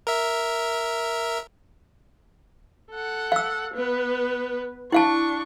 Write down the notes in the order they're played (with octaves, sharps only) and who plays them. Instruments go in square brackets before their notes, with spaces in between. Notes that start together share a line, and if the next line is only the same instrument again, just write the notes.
[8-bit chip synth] A#4 E5
[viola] A4 F#5
[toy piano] F5 E6
[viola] B3 B4
[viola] D4 C#6 [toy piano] E4 F5 A5